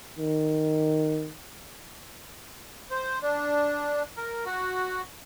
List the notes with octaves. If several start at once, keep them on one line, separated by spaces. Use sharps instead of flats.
D#3
C5
D4
A#4
F#4